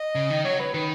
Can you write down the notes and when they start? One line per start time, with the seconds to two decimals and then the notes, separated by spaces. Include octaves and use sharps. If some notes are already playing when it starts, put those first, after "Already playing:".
Already playing: D#5
0.15 C#3
0.30 D#3
0.44 F#3 C#5
0.59 B4
0.73 D#3 B4